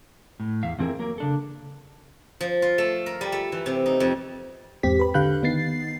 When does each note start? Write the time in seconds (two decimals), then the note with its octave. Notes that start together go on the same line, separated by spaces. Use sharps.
0.40 A2
0.63 E2 E5 F5
0.79 F2 E3 C4 G#4 A#4 E5
0.99 F#3 A#3 A#4
1.18 C#3 D4 A4
2.41 F3
2.62 F4
2.78 A3
3.06 A#4
3.21 G3
3.32 A3
3.52 E3
3.66 C3
3.86 D#4
4.00 F2
4.83 E2 G#2 C4 G4 B6
4.99 B4 B5
5.14 D3 G4 F5 B5 F#6 G6
5.43 D#3 B3 D#4 A6 C7